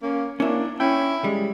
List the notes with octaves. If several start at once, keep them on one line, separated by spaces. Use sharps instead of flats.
A#3 C#4
A#3 C#4 D4 E4
C#4 E4 G5
G3 G#3